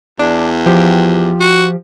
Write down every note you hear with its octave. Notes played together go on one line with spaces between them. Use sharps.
E2 D4
F3 G4
F#4